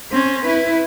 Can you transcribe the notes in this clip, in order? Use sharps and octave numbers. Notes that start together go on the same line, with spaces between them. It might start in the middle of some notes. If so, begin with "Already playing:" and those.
C4 C#4
E4 B4